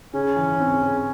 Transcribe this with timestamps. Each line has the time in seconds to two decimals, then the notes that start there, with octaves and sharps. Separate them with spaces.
0.14 C#3 C#4
0.36 E3
0.60 C4
0.83 C#3